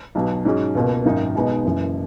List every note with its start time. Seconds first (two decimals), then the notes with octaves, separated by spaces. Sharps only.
0.15 B1 B2 F#3
0.45 G#2 F#3 C#4 G#4
0.75 C#2 B2 A#3
1.05 G#1 F#2 D#3 A#3 D#4
1.35 B1 B2 G#3 B3 D#4
1.65 F#1 F#2 E3